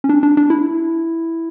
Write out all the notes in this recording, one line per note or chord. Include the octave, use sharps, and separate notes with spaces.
C#4
D4
D4
D4
E4